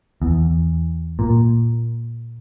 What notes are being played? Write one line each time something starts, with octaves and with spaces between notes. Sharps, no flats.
E2
A#2